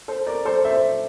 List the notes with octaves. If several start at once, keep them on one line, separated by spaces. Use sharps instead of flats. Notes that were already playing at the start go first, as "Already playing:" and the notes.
A4 C5
A#4 D5
A4 C5
C5 E5